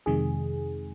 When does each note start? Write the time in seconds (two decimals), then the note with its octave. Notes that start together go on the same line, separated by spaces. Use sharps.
0.06 F2 C3 D#3 G#3 G#4